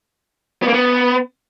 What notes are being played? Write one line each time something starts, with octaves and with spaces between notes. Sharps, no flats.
B3
A#3
B3